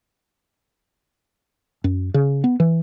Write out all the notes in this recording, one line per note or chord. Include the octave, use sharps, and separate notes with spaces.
F#2
C#3
B3
E3